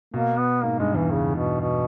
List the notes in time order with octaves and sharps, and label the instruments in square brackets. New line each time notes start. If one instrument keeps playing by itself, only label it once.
[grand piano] B2 [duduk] A#3
[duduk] B3
[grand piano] G#2 [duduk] A#3
[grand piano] G2 [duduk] G#3
[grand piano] E2 [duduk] E3
[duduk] C#3
B2
B2